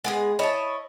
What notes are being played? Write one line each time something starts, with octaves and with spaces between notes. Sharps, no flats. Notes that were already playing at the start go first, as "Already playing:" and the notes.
G#3 B3 G4 G#4
E4 C#5 D#5 A5